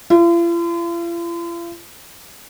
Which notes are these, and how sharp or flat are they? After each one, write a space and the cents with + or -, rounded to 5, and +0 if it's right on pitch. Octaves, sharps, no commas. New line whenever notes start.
F4 -45